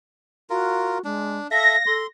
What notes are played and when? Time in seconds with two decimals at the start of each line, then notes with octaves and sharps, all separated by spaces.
0.50 F4 F#4 A#4
1.05 G#3 D4
1.51 A4 E5 F5 A#6
1.87 A4 C6